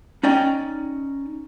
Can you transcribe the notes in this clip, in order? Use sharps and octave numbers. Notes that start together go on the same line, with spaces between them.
C#4 D#4 D5 G5